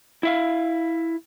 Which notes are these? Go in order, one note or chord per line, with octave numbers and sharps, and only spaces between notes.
E4 E5 F5